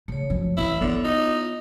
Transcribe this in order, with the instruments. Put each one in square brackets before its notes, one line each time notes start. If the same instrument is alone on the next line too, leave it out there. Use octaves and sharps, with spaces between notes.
[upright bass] C#3 [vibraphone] A3 C#5
[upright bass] F#2 F3
[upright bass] F2 E3 [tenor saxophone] E4
[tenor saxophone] D3 [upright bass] B3 E4
[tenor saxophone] D#4 [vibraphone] F4